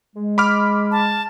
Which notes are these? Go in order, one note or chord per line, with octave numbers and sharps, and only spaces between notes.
G#3
B5 D6 F6
A5